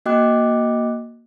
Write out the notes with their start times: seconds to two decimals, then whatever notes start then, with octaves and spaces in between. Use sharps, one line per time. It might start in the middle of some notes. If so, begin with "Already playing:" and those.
0.06 A#3 F#4 D#5 G5 D6 F#6